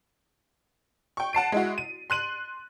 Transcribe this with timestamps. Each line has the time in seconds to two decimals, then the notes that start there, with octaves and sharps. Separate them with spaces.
1.17 G5 C#6
1.33 F#5 A5 C7 D7
1.52 G#3 E4 F#4
1.78 D#7
2.10 C6 F#6 D#7 F#7